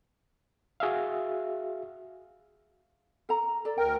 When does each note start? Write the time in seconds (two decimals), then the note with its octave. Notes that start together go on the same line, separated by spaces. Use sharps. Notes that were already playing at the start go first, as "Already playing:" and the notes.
0.80 F#4 G#4 E5 F5
3.29 A4 A#5
3.65 A4 D5
3.78 D2 A#4 G5